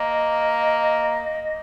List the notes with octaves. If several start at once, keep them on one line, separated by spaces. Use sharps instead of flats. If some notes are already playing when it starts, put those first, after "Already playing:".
Already playing: A#3 D#5